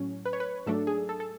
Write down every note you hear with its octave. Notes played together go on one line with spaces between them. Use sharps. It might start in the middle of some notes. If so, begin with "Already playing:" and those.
Already playing: A2 F#3 C#4
B4
C#5
B4
G#2 F#3 A3 D4 A4
G#4
A4
A4